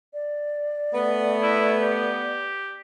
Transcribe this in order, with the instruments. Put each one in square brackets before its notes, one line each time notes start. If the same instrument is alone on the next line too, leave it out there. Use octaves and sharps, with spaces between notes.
[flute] D5
[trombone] A3 [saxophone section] B3
[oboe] E4
G4